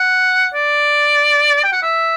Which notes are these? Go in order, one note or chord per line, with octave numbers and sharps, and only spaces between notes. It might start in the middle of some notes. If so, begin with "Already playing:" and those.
Already playing: F#5
D5
G5
F#5
E5